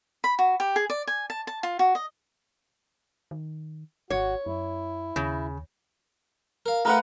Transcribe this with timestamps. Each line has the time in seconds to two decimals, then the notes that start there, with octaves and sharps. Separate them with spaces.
0.24 B5
0.39 F#4
0.60 G4
0.76 G#4
0.90 D5
1.07 G#5
1.30 A5
1.47 A5
1.63 F4
1.79 F#4
1.95 D#5
3.31 D#3
4.10 G#1 F#4 C#5
4.46 F#2 E4
5.16 D#2 C#3
6.66 A#4 F5
6.85 A3 D#4 F4 A#4 B4 F#5